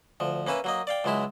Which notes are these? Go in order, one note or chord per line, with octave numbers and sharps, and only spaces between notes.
D2 F3
A#3 C#4 B4 E5 G#5
F#3 A#3 D#5
D5 F5 G5
C#2 F#3 G#3 E4 E5